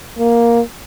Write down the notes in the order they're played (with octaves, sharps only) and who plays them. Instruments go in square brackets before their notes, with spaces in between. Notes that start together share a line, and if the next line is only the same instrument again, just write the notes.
[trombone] A#3